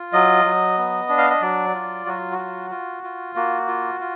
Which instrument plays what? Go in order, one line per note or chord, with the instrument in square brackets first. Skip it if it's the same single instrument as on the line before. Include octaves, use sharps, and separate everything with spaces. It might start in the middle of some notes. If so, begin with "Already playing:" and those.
Already playing: [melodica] F4
F#3 D#5
F#3
B3
D4
F5
D#5
F#3 D5
F4
F#3 F#4
F#4
F4
F4
F4
A#3 F#4
F4
F4